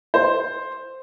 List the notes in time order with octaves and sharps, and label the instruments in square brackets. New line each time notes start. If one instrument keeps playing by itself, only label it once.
[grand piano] C5